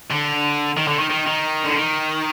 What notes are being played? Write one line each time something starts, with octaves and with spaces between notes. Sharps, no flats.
D3
D#3
D3
D#3
D#3
D#3
D3
D#3